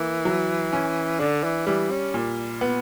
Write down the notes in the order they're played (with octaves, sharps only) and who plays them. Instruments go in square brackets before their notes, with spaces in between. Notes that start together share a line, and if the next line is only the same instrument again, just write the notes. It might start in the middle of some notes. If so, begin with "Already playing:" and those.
Already playing: [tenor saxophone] E3 [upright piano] A#3
[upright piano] F#3
C#4
[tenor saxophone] D3 [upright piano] D4
[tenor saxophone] E3
[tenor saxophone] E3 [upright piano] G3
[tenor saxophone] C#4
[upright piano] A#2
B3